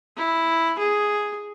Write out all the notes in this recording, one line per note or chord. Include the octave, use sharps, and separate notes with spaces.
E4
G#4